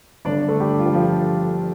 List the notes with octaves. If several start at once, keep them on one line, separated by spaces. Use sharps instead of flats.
G1 G2 D3 D4 D5
A3 A4
G3 G4
F4
G4
F3 F4